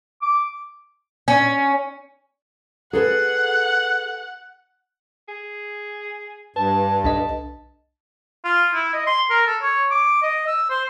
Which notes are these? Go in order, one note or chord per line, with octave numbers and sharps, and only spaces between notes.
D6
C#4
G#4 A4 B4 F#5
G#4
G2 B4 A5
B1 D4 D#5 A5
F4
E4
D#5
C6
A#4
A4
C#5
D6
D#5
E6
C5